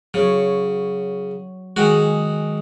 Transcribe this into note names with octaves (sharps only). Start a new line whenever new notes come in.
C#3 F#3 C#5
D#3 G#3 F#4 G#4